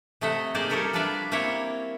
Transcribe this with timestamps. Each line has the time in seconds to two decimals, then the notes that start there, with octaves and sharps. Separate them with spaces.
0.21 C3 A3 D#5 E5 F#5
0.54 A#3 D#4 G#4 C5 D5 F5
0.70 G3 G4 A4 A#4 C#5 E5
0.93 G3 D4 F4 B4 D5 E5
1.32 A#3 C4 E4 A#4 C#5 E5